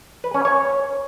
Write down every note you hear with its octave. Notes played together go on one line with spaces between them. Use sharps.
B4
C#4
C#5